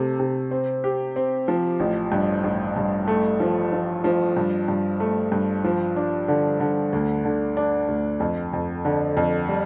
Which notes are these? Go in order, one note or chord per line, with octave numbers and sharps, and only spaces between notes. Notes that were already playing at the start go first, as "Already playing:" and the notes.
Already playing: C3 A3
C3
C4
G4
C4
F3
A1
G2
A1
G2
A3
F3
F3
F3
G2
G2
A3
G2
F3
D4
D3
D3
D2
D3
D4
D2
F2
F2
D3
F2
G3